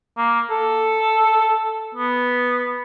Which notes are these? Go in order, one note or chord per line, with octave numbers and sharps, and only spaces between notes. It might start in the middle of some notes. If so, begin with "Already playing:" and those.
A#3
A4
B3